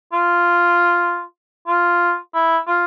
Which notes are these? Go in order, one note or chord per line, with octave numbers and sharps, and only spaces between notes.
F4
F4
E4
F4